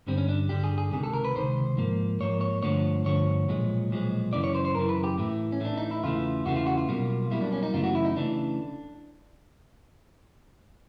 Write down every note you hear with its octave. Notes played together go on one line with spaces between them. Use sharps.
G2 D3 G3 C4
C#4
D4
G2 D3 G3 G4
G#4
G#4
C#2 C3 D#3 G#4
A4
A#4
B4
C#2 C3 D#3 C5
G#2 F3 A#3
G#2 F3 A#3 C#5
C#5
G2 D3 F3 A3 C#5
G2 D3 F3 A3 C#5
B1 A#2 F3 G#3
B1 A#2 F3 G#3
F#2 C#3 E3 D5
C#5
C5
C5
F#2 C#3 E3 A#4
B4
G4
A2 E3 A3
C#4
A2 E3 A3 D4
D#4
E4
E2 C#3 E3 A3 F4
E2 C#3 E3 A3 F#4
F4
F#4
F4
B1 B2 G3 A#3
B1 B2 G3 A#3 E4
D4
C#4
D#4
F#2 C#3 E3 A3 F4
F#4
E4
D#4
C#3 E3 A3 D4